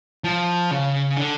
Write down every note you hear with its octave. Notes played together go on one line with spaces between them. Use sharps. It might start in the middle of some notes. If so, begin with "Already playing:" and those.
F3
C#3
D3